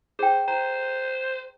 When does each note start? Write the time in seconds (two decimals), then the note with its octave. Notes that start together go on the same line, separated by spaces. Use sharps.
0.19 G#4 C5 G5
0.48 C5 A#5